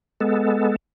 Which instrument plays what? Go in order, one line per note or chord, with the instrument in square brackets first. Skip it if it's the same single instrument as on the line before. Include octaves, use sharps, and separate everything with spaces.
[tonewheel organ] G#3 B3 A4